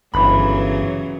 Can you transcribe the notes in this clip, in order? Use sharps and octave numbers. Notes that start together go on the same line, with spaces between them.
G1 C#3 E3 F#3 B5